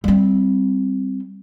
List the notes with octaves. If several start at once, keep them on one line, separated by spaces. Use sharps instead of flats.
G3 C4